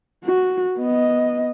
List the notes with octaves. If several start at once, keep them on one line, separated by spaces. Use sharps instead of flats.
F#4
B3 D#5